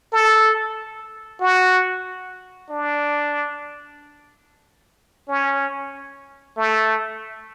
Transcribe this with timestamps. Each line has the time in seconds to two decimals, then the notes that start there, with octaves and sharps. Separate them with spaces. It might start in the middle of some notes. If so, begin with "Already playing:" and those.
0.12 A4
1.41 F#4
2.70 D4
5.28 C#4
6.57 A3